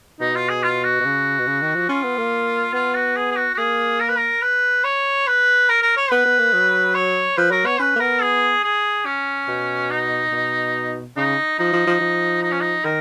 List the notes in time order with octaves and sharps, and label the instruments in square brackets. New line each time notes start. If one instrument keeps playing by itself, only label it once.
[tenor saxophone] B2 [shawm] D#4
[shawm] F4
G#4
F4
F#4
[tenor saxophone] B2
C#3
B2
C#3
D#3
F3
[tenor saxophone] C#4 [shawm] F4
[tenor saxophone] B3
A#3
[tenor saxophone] B3 [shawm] F4
[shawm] F#4
G#4
G#4
F#4
F#4
[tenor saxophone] A#3 [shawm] G#4
[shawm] A#4
B4
A#4
B4
C#5
B4
A#4
A#4
C#5
[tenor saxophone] B3 [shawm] B4
[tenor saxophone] B3
A#3
F#3
[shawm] C#5
[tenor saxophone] F3 [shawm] B4
[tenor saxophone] F#3 [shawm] A#4
[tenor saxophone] B3 [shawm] C#5
[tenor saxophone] C#4 [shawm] B4
[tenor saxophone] A#3
[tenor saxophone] B3 [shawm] A#4
[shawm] G#4
G#4
C#4
[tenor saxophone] B2
[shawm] D#4
[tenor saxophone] B2
[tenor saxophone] C#3 [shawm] D#4
[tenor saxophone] F3 [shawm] D#4
[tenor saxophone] F3
F3
F3
[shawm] D#4
C#4
D#4
[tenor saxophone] D#3 [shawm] A#4